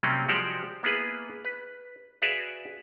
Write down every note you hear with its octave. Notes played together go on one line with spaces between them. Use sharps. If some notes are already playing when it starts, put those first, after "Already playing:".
C3 F#3 G3 A#3 C4 C#4
F3 G#3 F#4 G4 C5 D5
A#3 B3 E4 G#4 B4
B4
F#4 G#4 B4 D5 E5 F5